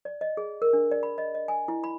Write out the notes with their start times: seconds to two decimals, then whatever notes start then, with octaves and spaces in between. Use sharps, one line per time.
0.05 D5
0.21 D#5
0.37 G#4
0.62 A#4
0.73 D4
0.91 D5
1.03 B5
1.18 D#5
1.35 D#5
1.48 G#5
1.68 E4
1.84 B5